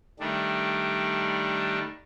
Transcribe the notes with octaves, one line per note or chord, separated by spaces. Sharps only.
D#3 G3 A3 D4